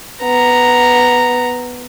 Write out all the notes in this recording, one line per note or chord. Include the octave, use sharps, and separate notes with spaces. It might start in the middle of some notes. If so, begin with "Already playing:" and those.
B3 A#5